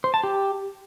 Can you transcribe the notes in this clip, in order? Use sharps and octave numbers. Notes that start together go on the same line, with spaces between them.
C5
A5
G4